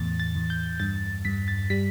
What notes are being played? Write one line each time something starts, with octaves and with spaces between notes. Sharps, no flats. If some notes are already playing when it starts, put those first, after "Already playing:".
Already playing: E2 A2 A6
A6
E2
G6
G2 A6
G2 B6
A6
G3 B6